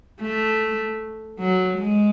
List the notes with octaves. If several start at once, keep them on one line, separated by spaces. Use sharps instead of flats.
A3
F#3
G#3